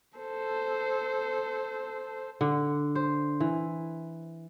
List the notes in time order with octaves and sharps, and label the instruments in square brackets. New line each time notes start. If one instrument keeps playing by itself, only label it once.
[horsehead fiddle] A4 C5
[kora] D3
C5
E3